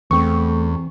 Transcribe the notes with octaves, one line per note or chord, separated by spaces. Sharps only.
E2 E3 A3 C4 C#6